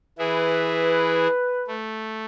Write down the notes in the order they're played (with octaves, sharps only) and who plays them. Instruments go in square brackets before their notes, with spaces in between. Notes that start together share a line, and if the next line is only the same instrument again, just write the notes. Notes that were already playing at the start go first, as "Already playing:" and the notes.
[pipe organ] E3 E4 G#4 [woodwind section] B4
[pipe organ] A3